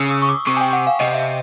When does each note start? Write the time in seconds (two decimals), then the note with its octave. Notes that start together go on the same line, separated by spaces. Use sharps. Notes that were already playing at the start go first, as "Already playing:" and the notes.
Already playing: C#3 E6
0.10 D#6
0.22 C#6
0.29 D6
0.47 C3 C#6
0.57 G#5
0.61 G5
0.73 F#5
0.87 F5
1.00 C3 D#5
1.14 E5